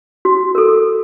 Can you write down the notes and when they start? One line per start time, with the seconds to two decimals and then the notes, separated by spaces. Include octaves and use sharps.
0.25 F#4
0.55 A4 A#4